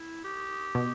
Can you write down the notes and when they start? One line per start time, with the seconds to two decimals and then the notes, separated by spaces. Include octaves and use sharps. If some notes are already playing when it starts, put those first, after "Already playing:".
Already playing: E4
0.24 G4
0.75 B2